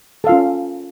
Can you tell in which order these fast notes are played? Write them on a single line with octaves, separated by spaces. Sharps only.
A4 F5 F4 C#4